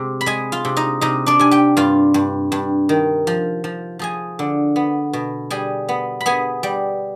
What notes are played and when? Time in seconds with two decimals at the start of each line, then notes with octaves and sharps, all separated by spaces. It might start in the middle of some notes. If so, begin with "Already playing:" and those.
Already playing: C3 G#3
0.21 B5
0.26 G#3 G#4 G#5
0.52 F4 F5
0.65 C3
0.77 D#4 D#5
1.01 C3 D#4 D#5
1.26 D4 D5
1.39 C3 G#5
1.51 G4 G5
1.77 G2 F4 F5
2.14 G2
2.52 G2
2.89 D#3
3.27 F3
3.64 F3
3.99 F3 G#4 G#5
4.39 D3
4.76 B3
5.13 B2
5.50 G3 G#4 G#5
5.89 B3
6.21 B5
6.26 B3 G#4 G#5
6.63 G3